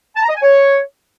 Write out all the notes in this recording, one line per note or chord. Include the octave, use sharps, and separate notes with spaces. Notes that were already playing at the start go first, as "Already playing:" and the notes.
A5
A#5
D#5
G#5
C#5